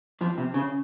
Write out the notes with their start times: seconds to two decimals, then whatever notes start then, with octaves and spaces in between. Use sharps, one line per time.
0.21 F2 F3
0.38 C3
0.54 C#3